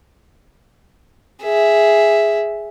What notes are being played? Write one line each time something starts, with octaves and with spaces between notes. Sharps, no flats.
G#4 E5